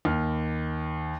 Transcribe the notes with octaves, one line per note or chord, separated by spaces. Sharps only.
D#2 F6